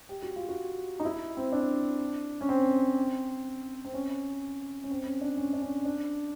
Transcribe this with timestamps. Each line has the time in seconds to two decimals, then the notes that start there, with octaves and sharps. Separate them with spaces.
0.09 G4
0.23 F#4
0.36 F4
0.49 F#4
1.00 D#4
1.05 E4
1.37 C4
1.52 D4
2.41 C#4
2.49 C4
3.85 C4
3.94 C#4
4.84 C#4
4.90 C4
5.06 C#4
5.21 D4
5.38 C#4
5.53 D4
5.62 C#4
5.85 D4